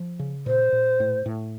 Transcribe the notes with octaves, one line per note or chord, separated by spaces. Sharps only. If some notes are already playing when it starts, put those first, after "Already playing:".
Already playing: F3
C#3
A#2 C5
A#2
A2
A2